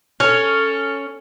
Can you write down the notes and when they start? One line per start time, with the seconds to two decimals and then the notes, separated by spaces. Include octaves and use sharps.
0.20 C#4 A4